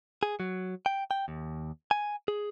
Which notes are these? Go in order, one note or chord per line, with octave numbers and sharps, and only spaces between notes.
G#4
F#3
G5
G5
D#2
G#5
G#4